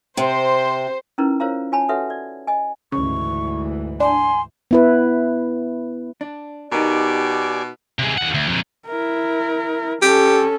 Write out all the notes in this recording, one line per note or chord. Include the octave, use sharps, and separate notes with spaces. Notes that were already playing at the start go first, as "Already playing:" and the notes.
C3 C5
C#4 D#4 E4 A#4 B4 A#5
F4 A#4 C5 C#5 F5 A#5
F4 C#5 G#5 A5 B5
F#4 A4 B4 C#5 E5 F#5
D5
D#5 G#5
D2 G#2 C#3 E3 C#6
D4 G#5 C6
B3 E4 B4
D4
B2 D#4 G4 A#4 D5 G#5
C3 G#3
D#2 F#5
D2
F2 A#2
E4 A#4
C#4 G4 A4